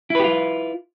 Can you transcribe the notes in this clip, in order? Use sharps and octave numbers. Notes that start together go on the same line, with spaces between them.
E4 F4 G4 B4